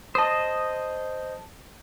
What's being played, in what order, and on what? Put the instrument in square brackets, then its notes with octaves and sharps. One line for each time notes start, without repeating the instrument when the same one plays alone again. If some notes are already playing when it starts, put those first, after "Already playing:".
[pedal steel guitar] C5 D#5 [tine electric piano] A5 D#6